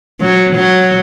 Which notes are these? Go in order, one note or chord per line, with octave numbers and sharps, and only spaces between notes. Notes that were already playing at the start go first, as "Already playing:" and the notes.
F#3
F#3